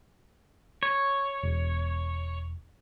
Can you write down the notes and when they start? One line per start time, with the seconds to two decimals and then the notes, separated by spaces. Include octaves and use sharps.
0.83 C#5
1.43 E1